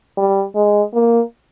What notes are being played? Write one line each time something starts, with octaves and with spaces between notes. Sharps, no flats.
G3
G#3
A#3